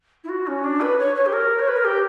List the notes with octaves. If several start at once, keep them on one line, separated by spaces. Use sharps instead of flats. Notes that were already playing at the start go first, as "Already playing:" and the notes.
E4
F#4
C#4
D4
B4
C#5
C#5
G4
A#4
C#5
B4
A#4
G4